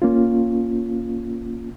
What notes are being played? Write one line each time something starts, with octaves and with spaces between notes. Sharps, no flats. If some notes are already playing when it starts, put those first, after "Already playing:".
A#3 C#4 F4